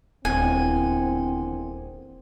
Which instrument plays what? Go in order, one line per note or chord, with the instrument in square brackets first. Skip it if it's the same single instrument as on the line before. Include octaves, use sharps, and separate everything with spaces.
[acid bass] D#1 [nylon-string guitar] E2 D3 [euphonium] C4 [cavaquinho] G#5